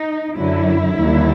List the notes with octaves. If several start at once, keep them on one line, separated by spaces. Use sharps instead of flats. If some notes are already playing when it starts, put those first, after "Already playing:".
Already playing: D#4
F#2 D3 F#3 E4
D#2 D3 G3